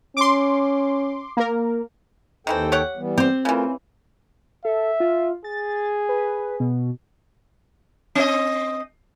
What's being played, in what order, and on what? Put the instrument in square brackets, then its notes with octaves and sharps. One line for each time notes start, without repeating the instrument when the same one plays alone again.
[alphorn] C#4 [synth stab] C6 D6
[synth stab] A#3 A#4
[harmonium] D#2 A4 G5 [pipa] D#3 E3 C4
[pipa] G4 C#5 F#5
[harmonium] E3 G3 B3
[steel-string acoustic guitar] C4 [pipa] G4 C5
[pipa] C#3 E3 [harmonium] A3 F4 A#4
[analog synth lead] A4 [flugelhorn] E5
[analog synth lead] F4
[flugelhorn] G#4 [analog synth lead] A6
[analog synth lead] B4
B2
[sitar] C4 D#5